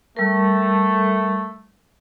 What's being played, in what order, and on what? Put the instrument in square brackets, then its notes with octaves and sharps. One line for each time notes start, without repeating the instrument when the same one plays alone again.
[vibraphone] G3 A#4 [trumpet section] A3